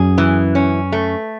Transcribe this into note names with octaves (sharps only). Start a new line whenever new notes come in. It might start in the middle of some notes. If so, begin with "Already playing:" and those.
Already playing: F#2 G#4
E3
C#4
A3